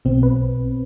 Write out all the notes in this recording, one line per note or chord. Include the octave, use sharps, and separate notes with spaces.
B1 B2 C4
B4